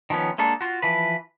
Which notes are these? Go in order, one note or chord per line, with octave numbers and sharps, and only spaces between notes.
D#3 F3 F#3 B3 C#4
G#3 A#3 D4 A4
F4 F#4
E3 F3 B4